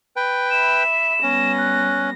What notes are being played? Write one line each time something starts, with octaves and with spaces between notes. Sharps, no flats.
B4 G5
E5 B5 E7
G3 B3 C#4 A#6
F#6